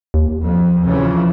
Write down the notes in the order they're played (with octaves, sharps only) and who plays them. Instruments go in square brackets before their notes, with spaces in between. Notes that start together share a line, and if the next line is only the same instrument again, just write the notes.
[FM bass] D#2
[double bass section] F2
C#3 E3 F3